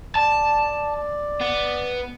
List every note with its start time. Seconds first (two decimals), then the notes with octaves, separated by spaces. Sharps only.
0.15 D5 A5
1.41 B3